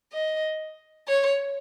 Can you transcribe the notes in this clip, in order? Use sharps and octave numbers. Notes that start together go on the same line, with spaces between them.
D#5
C#5